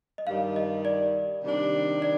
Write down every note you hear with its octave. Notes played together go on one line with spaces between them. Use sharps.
D#5
G2 D#3 G3 F5
D#5
D5
C3 D#3 G3 D4
D5